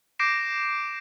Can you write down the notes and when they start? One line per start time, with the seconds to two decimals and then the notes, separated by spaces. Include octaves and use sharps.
0.19 D6 G6 A#6 C7 D7 E7